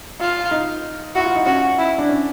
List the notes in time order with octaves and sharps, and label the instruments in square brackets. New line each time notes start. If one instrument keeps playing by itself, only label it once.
[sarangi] F4
[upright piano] D#4
[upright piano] E4 [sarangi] F#4
[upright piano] F4
D#4
[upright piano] C#4 [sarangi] F#4
[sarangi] E4
[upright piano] D4
C#4